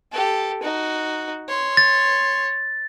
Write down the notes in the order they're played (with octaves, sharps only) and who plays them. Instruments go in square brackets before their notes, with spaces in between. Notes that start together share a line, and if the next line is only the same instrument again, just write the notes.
[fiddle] G4 A4
D#4 F#4
C#5 C6
[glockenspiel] A6